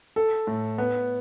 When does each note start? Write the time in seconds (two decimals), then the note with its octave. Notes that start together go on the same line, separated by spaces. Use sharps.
0.16 A4
0.47 A2
0.78 B3